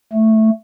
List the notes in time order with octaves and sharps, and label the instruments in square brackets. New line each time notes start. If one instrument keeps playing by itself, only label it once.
[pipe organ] A3